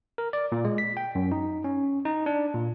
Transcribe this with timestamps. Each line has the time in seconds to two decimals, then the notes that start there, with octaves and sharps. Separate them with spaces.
0.18 A#4
0.33 D5
0.52 A#2
0.65 G#3
0.78 B6
0.97 G5
1.15 F#2
1.32 D#4
1.64 C#4
2.05 D#4
2.26 D4
2.54 A#2